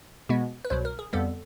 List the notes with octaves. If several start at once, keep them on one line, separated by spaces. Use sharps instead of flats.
B2 G#3 B3
B4
C2 B2 F#3 C5
A#4
G#4
F2 D3 G3 B3 A4